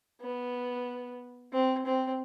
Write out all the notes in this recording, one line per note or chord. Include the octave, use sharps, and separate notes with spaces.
B3
C4
C4